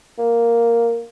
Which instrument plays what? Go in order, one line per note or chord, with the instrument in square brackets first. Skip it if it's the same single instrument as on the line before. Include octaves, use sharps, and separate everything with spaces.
[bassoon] A#3